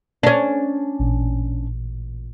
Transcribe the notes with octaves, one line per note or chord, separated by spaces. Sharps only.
C#4 D4
A1 A#2